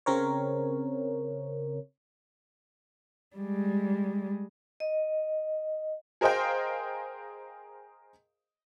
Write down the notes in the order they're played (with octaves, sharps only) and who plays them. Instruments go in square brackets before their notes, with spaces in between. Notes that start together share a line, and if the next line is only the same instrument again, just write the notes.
[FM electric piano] C#3 C4 A#4 C#5
[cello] G3 G#3
[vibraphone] D#5
[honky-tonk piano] G#4 A#4 C5 D#5 F5 G5